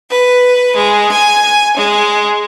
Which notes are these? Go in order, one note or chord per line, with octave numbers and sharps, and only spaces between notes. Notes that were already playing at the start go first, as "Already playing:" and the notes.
B4
G#3
G#5
G#3